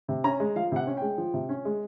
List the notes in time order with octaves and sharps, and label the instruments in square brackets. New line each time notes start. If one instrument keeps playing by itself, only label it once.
[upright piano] C3
C#4 A#5
G#3
F3 F5
C3 F#5
C#4
G#3 G5
F3
C3
C#4
G#3